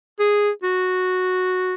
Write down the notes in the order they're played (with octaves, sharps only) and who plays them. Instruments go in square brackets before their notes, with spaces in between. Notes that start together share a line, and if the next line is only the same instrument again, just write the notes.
[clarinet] G#4
F#4